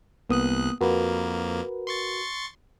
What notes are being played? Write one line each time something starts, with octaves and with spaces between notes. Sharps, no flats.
C2 A#3 B3 D#6 F#6
F2 A#3 F#4 A#4 B4
C6 C#6 A6